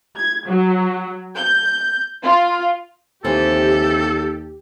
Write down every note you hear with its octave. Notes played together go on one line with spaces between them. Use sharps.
G#6
F#3
G6
F4
D#2 E3 F3 C4 G4 A4